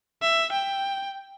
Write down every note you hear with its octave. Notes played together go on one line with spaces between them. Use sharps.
E5
G5